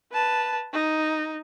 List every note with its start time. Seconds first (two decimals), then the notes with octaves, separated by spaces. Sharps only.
0.12 B4 A5
0.73 D#4